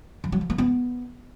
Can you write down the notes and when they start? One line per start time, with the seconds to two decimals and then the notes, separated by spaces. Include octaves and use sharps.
0.24 F3
0.32 F#3
0.41 F3
0.50 A#3
0.58 B3